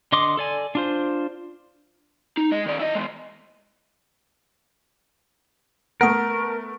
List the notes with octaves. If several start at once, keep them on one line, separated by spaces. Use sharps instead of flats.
D3 D#5 C6 D6 D#6
A4 D5 G#5
D4 F4 C5
D#4
G#3 D#5
D#3 D5
E4 D#5
E3 G#3
A3 B3 A#4 F#5 C6 D#6